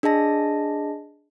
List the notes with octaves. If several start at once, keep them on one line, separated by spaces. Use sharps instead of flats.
D4 G#4 D#5 A5 A#6